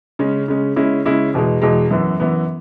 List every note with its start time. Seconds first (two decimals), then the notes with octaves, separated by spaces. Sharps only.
0.19 C#3 G#3 C#4
0.48 C#3 G#3 C#4
0.76 C#3 G#3 C#4 E4
1.05 C#3 G#3 C#4 E4
1.34 E2 B2 G#3
1.62 E2 B2 G#3
1.91 F#2 E3 B3
2.20 F#2 E3 B3